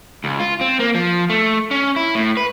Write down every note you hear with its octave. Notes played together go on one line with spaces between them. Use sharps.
C#2
F4
C4
A#3
F3
A3
C#4
E4
A2
B4